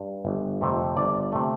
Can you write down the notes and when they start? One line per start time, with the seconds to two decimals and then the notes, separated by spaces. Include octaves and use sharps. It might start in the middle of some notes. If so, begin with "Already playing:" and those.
Already playing: G2
0.25 G1
0.61 F2 C3 A3
0.97 G1 D5
1.32 C3 A3